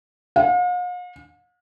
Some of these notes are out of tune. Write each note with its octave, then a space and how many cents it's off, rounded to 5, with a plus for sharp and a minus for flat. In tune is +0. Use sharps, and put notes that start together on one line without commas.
F5 +45